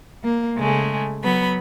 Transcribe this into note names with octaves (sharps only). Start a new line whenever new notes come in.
A#3
C#3 G#3 A3
F#3 B3 B5